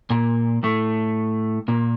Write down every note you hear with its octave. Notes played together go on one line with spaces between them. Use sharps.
A#2 A#3
A2 A3
A#2 A#3